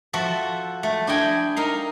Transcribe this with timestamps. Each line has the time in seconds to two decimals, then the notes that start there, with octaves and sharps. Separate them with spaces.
0.13 F3 F#4 A4 E5
0.83 A3
1.07 D4 E4 D#5 G5 G#5
1.56 D#4 A#4 F5